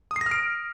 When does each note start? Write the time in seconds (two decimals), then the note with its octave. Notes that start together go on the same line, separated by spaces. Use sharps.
0.11 D#6
0.16 C7
0.21 A#6
0.26 F6
0.31 D7